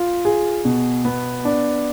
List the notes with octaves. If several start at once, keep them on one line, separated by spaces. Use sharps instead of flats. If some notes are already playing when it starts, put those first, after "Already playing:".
Already playing: F4
G#4
B2
B3
D4